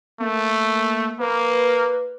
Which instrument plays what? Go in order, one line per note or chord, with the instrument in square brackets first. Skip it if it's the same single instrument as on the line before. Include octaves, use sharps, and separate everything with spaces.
[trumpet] A3 [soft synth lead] A#3
[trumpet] A#3 [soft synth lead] B4